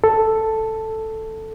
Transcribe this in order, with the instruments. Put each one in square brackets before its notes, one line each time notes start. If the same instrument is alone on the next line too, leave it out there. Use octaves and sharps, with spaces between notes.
[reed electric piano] A4